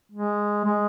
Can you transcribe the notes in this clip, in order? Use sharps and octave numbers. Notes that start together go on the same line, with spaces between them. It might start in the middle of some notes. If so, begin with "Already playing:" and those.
G#3
G#3